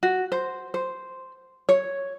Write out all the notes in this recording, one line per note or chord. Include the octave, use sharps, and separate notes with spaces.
F#4
C5
C5
C#5